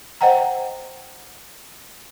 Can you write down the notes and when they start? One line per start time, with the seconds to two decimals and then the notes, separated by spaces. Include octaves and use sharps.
0.21 C5 D#5 F#5 G5 A#5